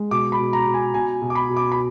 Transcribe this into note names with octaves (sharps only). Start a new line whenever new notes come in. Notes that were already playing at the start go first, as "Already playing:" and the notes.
Already playing: G#3
B2 D6
B5
B2
A#5
B2
G#5
B2 G#5
B2
D6
B5
B2
D6
B5